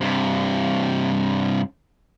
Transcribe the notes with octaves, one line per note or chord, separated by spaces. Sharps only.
G2 C3